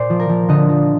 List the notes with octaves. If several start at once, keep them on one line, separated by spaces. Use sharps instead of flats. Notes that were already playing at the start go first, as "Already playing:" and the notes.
Already playing: A#2 C5 D5
F3
A#4
F3
D3 D#5
F3